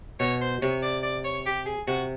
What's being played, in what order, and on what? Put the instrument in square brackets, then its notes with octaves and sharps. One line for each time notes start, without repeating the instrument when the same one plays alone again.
[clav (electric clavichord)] B2 [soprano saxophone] C#5
[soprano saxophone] C5
[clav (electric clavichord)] C3 [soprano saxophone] C#5
[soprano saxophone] D5
D5
C#5
G4
G#4
[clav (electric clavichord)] C3 [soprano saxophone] F#4